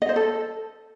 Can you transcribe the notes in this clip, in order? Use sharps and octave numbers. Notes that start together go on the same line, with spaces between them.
D#5
C5
A4